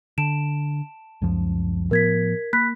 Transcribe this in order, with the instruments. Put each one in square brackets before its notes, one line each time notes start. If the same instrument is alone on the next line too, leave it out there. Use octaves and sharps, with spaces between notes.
[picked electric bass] D3 [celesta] A5 D7 E7
[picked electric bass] C#2 F#2 F3
[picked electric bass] A2 F3 B3 [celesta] A#4 G#6 B6
[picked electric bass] A#3 [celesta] B5 F#6 B6